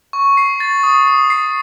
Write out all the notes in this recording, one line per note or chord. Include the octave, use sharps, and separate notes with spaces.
C#6
C7
A6
D#6
D#6
C7